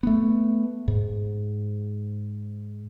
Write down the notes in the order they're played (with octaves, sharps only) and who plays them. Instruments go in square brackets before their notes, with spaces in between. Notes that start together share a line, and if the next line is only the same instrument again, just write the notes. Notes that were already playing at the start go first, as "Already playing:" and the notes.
[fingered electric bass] A3 B3
G#2